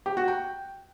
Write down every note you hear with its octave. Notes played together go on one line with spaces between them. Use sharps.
G4
F#4
G5